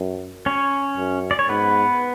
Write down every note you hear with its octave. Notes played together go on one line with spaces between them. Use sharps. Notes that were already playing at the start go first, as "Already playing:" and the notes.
Already playing: F#2
C#4 C#5
F#2
D5
C#5
G#2 B3 B4